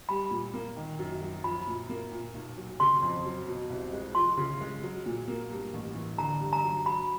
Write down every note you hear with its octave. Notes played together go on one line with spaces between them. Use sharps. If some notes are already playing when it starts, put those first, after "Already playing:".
G3 B5
A#2
A#3
D#3
F#2
F#3
F3 B5
A#2
A#3
A#2
B1
F#3
C#3 C6
F2
F#3
B2
C2
G#3
F3 C6
C#3
G#3
F#3
A#2
A#3
G2
A1
E3
D3 A#5
G2
A#5
F#3
F#3 B5